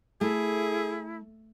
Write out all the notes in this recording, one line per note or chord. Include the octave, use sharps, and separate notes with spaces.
A3 E4 G#4